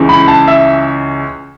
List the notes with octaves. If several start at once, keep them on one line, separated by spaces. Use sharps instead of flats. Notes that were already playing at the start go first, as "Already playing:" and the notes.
Already playing: C#2 C#3 E3
B5
A5
E5